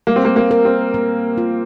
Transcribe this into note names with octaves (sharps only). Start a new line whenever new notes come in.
G3 A#3
C4
A#3
A#3
A#4
C4
A#3
F4